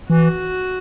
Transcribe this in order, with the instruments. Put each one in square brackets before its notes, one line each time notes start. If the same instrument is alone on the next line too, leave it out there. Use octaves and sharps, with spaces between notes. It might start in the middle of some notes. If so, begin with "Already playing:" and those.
[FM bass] E3 [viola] F#4